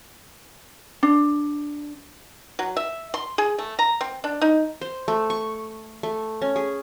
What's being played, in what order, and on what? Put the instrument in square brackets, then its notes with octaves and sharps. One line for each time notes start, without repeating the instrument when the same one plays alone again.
[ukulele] D4
[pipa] F#3
E5
C6
G#4
A3
A#5
C4
D4
D#4
[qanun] C5
A3
C#6
A3
C#4
G#4